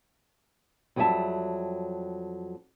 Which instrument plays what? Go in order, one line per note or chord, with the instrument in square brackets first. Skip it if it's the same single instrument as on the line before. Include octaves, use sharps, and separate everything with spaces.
[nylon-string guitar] F2 F#3 G3 G#4 E5 A5